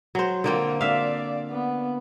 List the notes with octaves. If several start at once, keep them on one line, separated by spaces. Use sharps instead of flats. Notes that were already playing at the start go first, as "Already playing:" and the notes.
F#3 C5
D3 A#3 C4 F4
D5 E5 F5
B3